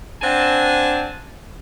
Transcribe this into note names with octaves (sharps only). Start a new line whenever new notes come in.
C4 D4 F#5 G#5 A5